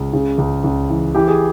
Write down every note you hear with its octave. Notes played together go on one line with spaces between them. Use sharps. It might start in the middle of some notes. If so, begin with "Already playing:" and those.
Already playing: C#2
C#3
C#2
C#2
E3
E3 G4
G#4